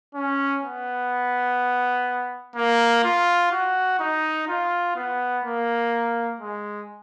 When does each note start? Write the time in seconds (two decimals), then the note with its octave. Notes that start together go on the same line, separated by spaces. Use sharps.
0.15 C#4
0.63 B3
2.56 A#3
3.04 F4
3.52 F#4
4.00 D#4
4.48 F4
4.96 B3
5.44 A#3
6.41 G#3